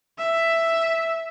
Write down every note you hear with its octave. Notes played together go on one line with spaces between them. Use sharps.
E5